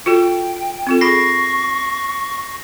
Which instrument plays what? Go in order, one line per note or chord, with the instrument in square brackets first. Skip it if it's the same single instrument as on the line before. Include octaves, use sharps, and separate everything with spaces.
[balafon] F4 F#4 A4 [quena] G5
[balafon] C4 F4 A4
[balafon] G#4 B5 [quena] C#6 [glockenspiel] A#6 C7